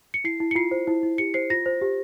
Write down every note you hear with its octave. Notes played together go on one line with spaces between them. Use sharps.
C#7
E4 C7
E4
C#7
F4 C7
C5
E4
E4
G4 C#7
C5 C7
F4 A#6
C5
G4